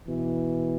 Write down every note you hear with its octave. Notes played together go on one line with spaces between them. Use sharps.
B2 E3